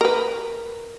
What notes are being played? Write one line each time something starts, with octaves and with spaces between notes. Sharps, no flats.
A#4 B4